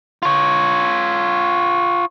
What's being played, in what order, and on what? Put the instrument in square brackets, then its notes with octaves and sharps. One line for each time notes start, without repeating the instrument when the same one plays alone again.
[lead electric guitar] F4 C#5